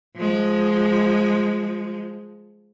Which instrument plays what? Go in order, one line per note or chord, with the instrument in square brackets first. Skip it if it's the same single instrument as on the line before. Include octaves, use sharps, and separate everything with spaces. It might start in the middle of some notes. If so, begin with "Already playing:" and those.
[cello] F3 G#3